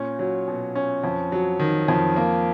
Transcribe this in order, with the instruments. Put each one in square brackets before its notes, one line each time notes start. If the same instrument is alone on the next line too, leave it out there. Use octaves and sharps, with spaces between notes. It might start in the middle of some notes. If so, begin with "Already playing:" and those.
Already playing: [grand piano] A#2 C#4
F#3
B2
C#4
F2
F#3
D#3
F2
A#3